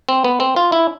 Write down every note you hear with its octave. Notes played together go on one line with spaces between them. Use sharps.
C4
B3
C4
F4
E4